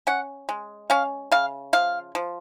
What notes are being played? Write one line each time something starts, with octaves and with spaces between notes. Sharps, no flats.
C#4 F#5
G#3
C#4 F5
C#3 F5
F3 F5
F3